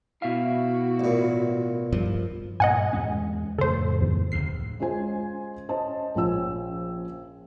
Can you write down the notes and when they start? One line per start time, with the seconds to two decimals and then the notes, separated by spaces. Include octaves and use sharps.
0.22 B2 E4 F#4 E5 F5
1.00 A1 A#2
1.92 G2 F3
2.60 G2 A#2 D#5 F#5 G#5
2.93 E2 G#3 C#4
3.58 F2 A2 C#3 A4 C5
4.01 E2
4.32 D1 D2 C7
4.79 G#3 C#4 F4 C5 G#5
5.69 C#4 C5 D#5 A5
6.15 A#1 F3 C#4 E6